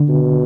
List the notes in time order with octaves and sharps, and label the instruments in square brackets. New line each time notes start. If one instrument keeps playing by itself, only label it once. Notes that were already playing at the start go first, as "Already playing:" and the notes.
Already playing: [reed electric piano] D3
[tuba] B2